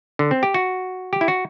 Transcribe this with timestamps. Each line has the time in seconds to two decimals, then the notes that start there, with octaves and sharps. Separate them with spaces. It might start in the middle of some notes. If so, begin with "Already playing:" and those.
0.19 D3
0.31 C4
0.43 G4
0.54 F#4
1.13 G4
1.21 E4
1.28 F#4